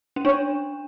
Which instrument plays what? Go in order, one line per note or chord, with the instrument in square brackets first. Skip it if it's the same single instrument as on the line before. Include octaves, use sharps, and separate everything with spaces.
[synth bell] C#4
[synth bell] D4 [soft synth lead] C#5